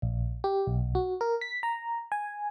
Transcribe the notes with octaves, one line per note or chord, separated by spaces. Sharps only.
A#1
G4
B1
F#4
A#4
B6
A#5
G#5